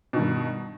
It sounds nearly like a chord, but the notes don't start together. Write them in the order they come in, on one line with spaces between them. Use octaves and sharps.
B2 D#3 G2